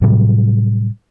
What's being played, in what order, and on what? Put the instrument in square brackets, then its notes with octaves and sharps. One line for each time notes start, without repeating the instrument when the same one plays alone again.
[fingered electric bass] A2 C3 F#3 G3